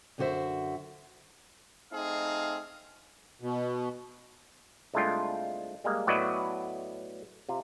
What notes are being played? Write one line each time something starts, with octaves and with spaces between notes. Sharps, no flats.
F#2 D3 F4 F#4 C5 E5
A3 C4 D#4 G#4 F5
B2
C2 G#3 A3 D4 F4 G5
G3 G#3 A#3
A2 F#3 B3 E4 D5 D#5
C3 F4